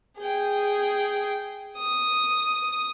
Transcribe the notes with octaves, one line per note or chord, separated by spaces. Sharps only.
G#4 G5
D#6